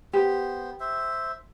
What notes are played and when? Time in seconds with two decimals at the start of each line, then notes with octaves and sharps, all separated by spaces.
0.13 B3 G4 C5
0.80 C5 E5